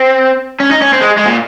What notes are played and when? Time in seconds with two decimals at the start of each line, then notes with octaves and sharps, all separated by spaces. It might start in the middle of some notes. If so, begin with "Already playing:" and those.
Already playing: C4
0.60 C#4
0.71 D#4
0.82 C#4
0.93 C4
1.01 G#3
1.17 G#3
1.25 A#2